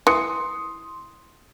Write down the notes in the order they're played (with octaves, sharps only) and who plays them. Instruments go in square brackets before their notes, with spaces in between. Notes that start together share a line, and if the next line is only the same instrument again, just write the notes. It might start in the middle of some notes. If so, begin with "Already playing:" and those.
[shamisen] E3 [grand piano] C6 D#6 C#7